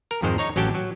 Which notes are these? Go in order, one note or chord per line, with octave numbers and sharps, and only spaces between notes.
A#4
F2 G#2 D#3 G#3 C5
D#4 C#5 A#5
A1 F#3 C#4 G4 G5 A5
F#3